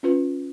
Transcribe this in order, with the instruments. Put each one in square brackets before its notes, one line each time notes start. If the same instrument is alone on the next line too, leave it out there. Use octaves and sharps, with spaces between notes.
[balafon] C#4 F4 B4